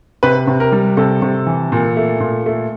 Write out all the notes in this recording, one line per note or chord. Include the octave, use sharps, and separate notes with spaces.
C3 B4
C3
A#4
G3
C3 A4
C3
E3
A#2
A3
A#2
A3